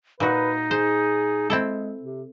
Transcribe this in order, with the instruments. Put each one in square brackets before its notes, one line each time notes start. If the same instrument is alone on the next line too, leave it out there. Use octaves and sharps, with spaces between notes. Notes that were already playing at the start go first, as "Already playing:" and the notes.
[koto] A#2 F#4 [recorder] D#4 [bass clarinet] B4
[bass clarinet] G#4 [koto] C5
[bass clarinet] G#3 [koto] C4 E4 A4
[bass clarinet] C3